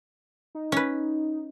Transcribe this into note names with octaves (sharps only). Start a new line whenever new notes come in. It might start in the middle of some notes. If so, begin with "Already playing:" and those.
D#4
C#4 B4